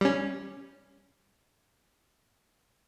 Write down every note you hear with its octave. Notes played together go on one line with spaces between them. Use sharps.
G3 C#4